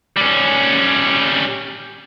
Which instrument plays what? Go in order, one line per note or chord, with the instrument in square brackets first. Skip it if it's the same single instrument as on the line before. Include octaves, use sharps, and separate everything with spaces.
[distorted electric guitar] G3 C#4